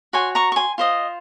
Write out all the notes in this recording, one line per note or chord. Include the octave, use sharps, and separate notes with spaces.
F#4 C#5 G#5 C6
A#5 C#6
C#6
G#5 C6
F4 C5 D#5